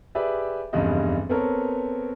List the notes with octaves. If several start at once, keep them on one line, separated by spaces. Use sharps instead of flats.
G4 G#4 B4 D5 E5
F1 E2 G2 C#3 G3 D#5
B3 C4 A4 A#4 C#5